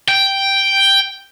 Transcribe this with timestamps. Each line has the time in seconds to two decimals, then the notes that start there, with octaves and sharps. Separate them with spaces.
0.08 G5